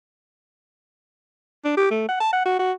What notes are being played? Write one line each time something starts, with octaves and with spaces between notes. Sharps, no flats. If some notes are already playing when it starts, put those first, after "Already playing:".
D4
G4
A3
F#5
A5
F#5
F#4
F#4